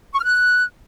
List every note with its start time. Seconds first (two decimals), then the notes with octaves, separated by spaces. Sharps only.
0.13 C#6
0.19 F6
0.24 F#6